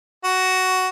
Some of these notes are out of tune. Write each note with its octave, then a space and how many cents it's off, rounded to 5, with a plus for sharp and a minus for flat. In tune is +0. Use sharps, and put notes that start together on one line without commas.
F#4 +10